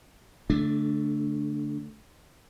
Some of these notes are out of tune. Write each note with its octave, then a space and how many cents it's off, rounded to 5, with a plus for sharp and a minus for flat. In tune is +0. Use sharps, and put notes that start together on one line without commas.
D3 -35 A3 +0 D4 +0